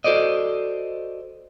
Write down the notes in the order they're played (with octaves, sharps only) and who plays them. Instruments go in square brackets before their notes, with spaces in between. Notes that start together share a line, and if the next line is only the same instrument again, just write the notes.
[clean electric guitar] F#4 A4 C5 D5 D#5